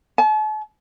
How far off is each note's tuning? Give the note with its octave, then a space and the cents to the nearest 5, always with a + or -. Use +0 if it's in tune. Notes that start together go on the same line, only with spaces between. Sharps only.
A5 -45